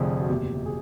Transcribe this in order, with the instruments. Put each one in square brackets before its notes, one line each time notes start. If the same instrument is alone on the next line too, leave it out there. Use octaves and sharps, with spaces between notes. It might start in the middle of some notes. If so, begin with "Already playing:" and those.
Already playing: [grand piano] F1 F2 D3 F3 G#4
F#4
F#1 E2 B2 G4
G#4